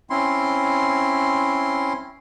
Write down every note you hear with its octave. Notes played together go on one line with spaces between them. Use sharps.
C4 C#4 E4 C6